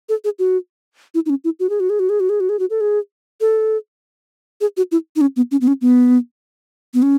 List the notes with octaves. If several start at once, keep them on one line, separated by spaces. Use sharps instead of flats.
A4
G#4
F#4
E4
D#4
C#4
E4
F#4
G#4
F#4
G#4
F#4
G#4
F#4
G#4
F#4
G#4
F#4
A4
G#4
A4
G#4
F#4
E4
D#4
C#4
B3
C#4
B3
C#4
B3
B3
C#4